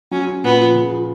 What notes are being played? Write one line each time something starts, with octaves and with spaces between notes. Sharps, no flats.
F#3 C#4
C#4
A#2 B3
F3
C#3
F3